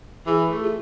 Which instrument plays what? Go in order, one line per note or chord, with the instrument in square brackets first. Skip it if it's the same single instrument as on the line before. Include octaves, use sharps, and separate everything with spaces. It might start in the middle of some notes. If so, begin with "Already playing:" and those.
[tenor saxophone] E3 [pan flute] G#4
[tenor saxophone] A3
[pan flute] F4